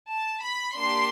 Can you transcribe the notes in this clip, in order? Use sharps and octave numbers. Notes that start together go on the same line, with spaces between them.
A5
B5
A#3 D4 G4 C6